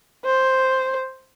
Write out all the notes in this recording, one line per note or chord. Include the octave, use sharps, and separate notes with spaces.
C5